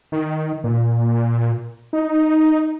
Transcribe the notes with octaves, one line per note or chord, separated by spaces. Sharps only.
D#3
A#2
D#4